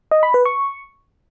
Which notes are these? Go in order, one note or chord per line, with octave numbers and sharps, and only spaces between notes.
D#5
B5
B4
C#6